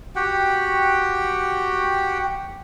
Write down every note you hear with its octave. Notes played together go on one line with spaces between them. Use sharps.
F#4 G4 F#5 G5